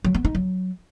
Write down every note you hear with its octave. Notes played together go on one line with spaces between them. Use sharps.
F#3
B3
D#4
F#3